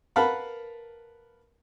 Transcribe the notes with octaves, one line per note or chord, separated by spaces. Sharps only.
A#4 B4 F5 F#5 A5 B5